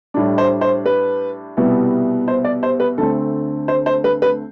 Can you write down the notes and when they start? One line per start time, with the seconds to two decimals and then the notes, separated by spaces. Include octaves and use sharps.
0.14 A2 G3 D4
0.38 C5
0.61 C5
0.86 B4
1.57 C2 B2 G3 B3 E4
2.28 C5
2.44 D5
2.63 C5
2.80 B4
2.98 D2 D3 A3 C4 A4
3.68 C5
3.86 C5
4.04 B4
4.22 B4